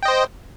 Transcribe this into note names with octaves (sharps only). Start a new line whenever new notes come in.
C5 D#5 G5